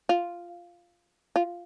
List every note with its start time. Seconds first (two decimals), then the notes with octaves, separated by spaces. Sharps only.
0.09 F4
1.36 F4